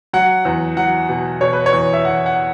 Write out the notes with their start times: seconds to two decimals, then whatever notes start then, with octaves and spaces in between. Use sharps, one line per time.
0.13 F#3 F#5
0.45 E2
0.77 F#3 F#5
1.09 B2
1.41 B2 C#5
1.53 B4
1.66 C#5
1.73 E2
1.93 E5
2.05 E2 F#5
2.26 F#5